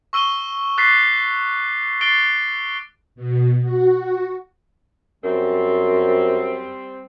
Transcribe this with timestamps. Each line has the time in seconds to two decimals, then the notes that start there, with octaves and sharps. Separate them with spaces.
0.13 C#6 E6 D#7 G7
0.77 D6 F#6 A6 B6 C7
2.01 D6 A6 C7 D7 G7
3.15 B2
3.61 F#4
5.24 F#2 G3 C4